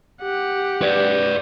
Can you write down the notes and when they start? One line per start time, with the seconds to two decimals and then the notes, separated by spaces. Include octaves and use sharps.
0.22 G4 F#5
0.82 B4 D5